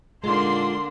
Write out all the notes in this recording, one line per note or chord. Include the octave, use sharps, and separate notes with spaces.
A#2 D3 G#3 A#3 D4 D#4 C6